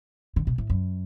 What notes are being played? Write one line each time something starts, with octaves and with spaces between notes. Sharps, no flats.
D3
B2
A2
F#2